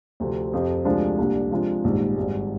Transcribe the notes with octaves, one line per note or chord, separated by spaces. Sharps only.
D2 C3 F3 C4
F2 C3 F3 C4 G4
D2 C3 F3 G#3 D4
C2 A#2 G3 D4
C3 F3 G#3 D4 F4
A#1 G#2 D#3 G3
G#1 G2 D#3 G#3